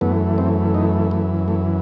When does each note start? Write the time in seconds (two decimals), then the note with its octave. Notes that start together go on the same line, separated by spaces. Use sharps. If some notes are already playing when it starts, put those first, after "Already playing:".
0.01 F#2 E3 A3 B3
0.38 C4
0.74 D#4
1.11 A3
1.48 A3